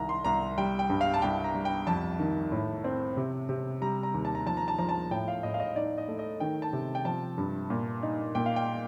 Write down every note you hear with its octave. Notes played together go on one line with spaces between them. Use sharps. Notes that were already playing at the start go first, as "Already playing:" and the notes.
Already playing: C2 D#3 A#5
C6
C2 A#5
G3 G5
G5
G2
F5
A5
C2 G5
A#5
G3
G5
F2 A5
D#3
A2
C4
C3
C3
G3 A#5
A#5
D#2
A5
A#5
F3 A5
A#5
A5
F3 A#5
A5
A2 G5
F5
A2 D#5
F5
D#5
D#4 D5
D#5
A3
D#5
D#3 G5
A5
C3
G5
F3 A5
G2
A#2
D#4
A#2 G5
F5
G5